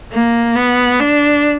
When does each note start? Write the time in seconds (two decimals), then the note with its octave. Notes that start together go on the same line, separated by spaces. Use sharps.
0.12 A#3
0.56 B3
1.00 D4